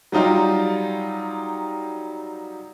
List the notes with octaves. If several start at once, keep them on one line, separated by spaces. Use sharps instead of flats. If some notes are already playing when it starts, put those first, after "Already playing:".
F#3 G3 D#4 F4 G4